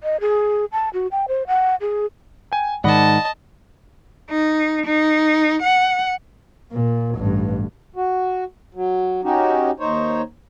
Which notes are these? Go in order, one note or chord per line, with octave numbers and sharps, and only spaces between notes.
D#5
G#4
A5
F#4
G5
C5
F#5
G#4
G5 G#5
G#2 D#3 D5 D#5 F#5 A5 B5
D#4
D#4
F#5
A#2
A1 G2
F#4
F#3
C#4 D#4 F#4 G4
D#2 D#4 C5 C#5